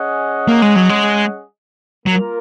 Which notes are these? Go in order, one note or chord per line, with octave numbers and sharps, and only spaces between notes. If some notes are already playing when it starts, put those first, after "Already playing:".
Already playing: C#4 G#4 D#5 F#5
A#3
G#3
F#3
G#3
F#3 A#3 F4 A#4